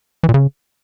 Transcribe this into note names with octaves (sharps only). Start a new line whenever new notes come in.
E3
A#2
C#3